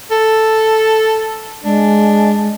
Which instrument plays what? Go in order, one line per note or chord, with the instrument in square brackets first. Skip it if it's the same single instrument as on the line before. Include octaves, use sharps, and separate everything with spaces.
[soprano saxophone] A4
[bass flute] G#3 [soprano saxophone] D4